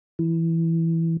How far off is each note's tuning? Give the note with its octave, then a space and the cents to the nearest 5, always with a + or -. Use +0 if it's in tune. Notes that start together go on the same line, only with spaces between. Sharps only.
E3 +0